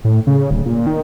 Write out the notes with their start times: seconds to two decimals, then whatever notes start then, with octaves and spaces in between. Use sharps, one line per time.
0.05 A2
0.27 C#3
0.51 D1
0.66 A#2
0.87 D#3